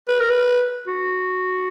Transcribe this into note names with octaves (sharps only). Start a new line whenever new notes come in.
B4
A#4
B4
F#4